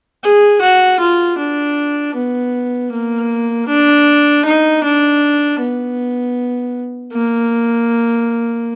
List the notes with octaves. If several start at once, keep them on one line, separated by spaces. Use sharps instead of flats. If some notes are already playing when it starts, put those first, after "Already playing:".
G#4
F#4
F4
D4
B3
A#3
D4
D#4
D4
B3
A#3